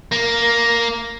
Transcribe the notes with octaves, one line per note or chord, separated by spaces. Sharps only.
A#3